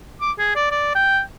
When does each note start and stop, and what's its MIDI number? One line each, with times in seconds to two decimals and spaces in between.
0.21 0.32 86
0.39 0.52 68
0.55 0.68 74
0.71 0.94 74
0.95 1.21 79